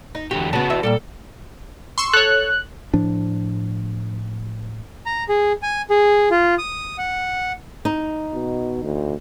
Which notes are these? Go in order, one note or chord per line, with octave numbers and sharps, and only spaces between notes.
D#4
E2 D3 F#4 G4
C#3 B3 F#4 B4 A5
E2 E5
A#2 C#3 G3 A4
C6 C#6 E6
A4 C#5 F#6
A2 F3 D4
A#5
G#4
G#5
G#4
F4
D#6
F#5
D#4
B2
D2